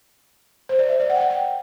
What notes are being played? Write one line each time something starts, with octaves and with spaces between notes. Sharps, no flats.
C5
D5
E5
D5
F#5
G5
F#5
G5